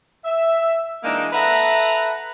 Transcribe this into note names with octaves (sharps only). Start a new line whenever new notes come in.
E5
E3 G#3 A#3 D4 D#4
A4 B4 E5 F#5 A#5